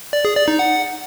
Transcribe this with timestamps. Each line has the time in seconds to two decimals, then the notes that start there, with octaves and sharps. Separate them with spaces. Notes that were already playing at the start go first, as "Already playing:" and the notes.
0.13 D5
0.25 G#4
0.36 D5
0.48 D#4
0.59 F#5